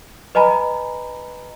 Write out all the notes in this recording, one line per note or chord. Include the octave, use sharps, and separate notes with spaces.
B4 D#5 G#5 A#5 B5